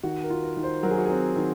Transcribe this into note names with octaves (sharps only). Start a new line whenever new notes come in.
D#3 F#4
A#4
F4
A#4
D#3
C5
F#3 A#4
G#4
F#4
C4 G#4
D#3